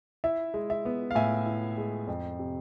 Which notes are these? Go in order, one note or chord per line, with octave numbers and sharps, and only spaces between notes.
E4 E5
G#3
E5
B3
F5
A2 E5 G#5
E4
G#3
F2
C3